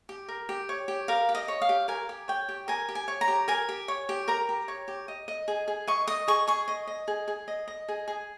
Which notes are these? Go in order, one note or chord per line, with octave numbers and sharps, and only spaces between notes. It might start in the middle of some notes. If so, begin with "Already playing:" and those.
G4
A#4
G4
C#5
G4
A#4 F5
G4
D#5
C#5
F5
G4
A#4 G#5
G4
C#5 G5
G4
A#4 G#5
G4
G#5
C#5
A#5
G4
A#4 G#5
G4
C#5
G4
A#4 A#5
G4
C#5
G4
D#5
D#5
G#4
G#4
D#5 C#6
D#5 D#6
G#4 C#6
G#4 C#6
D#5
D#5
G#4
G#4
D#5
D#5
G#4
G#4